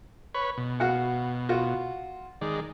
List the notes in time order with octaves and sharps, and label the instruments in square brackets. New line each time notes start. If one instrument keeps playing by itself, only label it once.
[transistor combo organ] B4 C#5
B2
[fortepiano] F#4 F5 F#5
F4 F#4
[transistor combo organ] D#3 G#3 D5